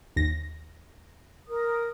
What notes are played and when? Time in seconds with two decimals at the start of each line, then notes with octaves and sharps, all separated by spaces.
0.16 D#2 A#6
1.48 A#4 D#6